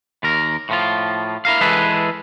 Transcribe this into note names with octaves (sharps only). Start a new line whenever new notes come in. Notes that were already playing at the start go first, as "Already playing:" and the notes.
D#2 A#4
A2 F3 F4
E4 A#4 F5
E3 G#3 G#4 A4 B4